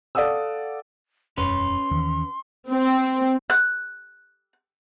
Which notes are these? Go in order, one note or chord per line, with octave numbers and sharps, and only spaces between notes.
A4 D5 F5 F#5 D#6 E6
E1 F#2 C#4 B4 C6
D#2 D#3 E3
C4
F#6